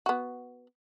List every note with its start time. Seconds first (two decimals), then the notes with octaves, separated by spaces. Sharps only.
0.06 B3 F#4